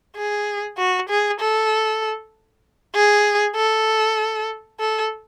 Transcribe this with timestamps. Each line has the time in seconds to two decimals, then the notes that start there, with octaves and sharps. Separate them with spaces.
0.16 G#4
0.78 F#4
1.09 G#4
1.41 A4
2.95 G#4
3.56 A4
4.80 A4